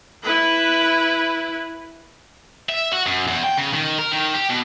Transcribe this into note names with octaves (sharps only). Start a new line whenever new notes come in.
E4 B4
E5
F#4
F#2
E2
G5
C#3
D#3
A#4
D#3
G4
B2